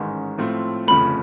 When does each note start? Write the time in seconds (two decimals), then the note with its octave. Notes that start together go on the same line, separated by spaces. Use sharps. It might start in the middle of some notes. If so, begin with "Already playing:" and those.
Already playing: A1 G#2 D#3 G#3 C#4
0.38 A2 F3 A3 C4 F4
0.88 G1 F2 C#3 F3 A3 B5